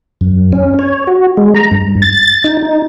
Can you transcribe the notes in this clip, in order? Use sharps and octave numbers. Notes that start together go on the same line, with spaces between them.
F#2
C#4
C#5
F#4
G#3
A#5
G2
A6
D#4
D#4